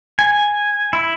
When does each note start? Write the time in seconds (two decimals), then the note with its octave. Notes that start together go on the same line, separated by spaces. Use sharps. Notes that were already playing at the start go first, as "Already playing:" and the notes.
0.19 G#5
0.93 E4